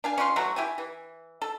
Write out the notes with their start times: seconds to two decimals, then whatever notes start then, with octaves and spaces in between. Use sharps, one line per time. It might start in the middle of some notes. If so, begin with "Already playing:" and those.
0.04 D4 F5 G#5
0.18 C#4 F4 F#5 C6
0.36 E3 F#3 A3 F#4
0.56 E4 G4 E5 G#5
0.78 E3
1.42 A4